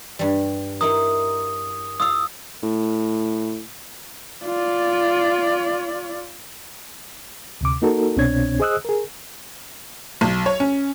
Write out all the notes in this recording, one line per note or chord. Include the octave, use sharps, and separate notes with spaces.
G2 G3
D#4 E4 A#4 D#6
F4 F5 D#6 E6
A2
F4 D5
D2 C3 D6
A#3 D#4 F#4 A4 A#4
C2 B2 C4 D4 C#5 G#6
G#4 C5 D#5 D#6 E6 F#6
G#4 A#4
B1
C#5
C#4